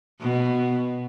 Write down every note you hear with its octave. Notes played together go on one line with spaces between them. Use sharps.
B2